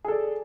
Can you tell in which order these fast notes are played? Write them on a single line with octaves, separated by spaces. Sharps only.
G#4 A4 D5